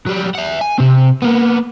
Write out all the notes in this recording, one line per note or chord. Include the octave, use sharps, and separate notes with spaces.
F#3 G3
E5 F#5
G#5
C3 C4
A#3 B3